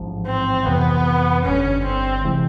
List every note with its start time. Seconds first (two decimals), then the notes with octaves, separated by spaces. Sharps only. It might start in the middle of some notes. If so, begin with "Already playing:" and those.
Already playing: A1 G#2 F3
0.26 C4
0.65 F2 C3 E3 B3
1.44 G1 G2 D3 C#4
1.84 C4
2.24 C3 E3 G#3